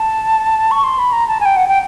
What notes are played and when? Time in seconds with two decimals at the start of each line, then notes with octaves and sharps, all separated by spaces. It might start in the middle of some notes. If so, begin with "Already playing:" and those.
Already playing: A5
0.71 C#6
0.84 C6
0.99 B5
1.12 A#5
1.28 A5
1.40 G#5
1.45 G5
1.57 F#5
1.68 G5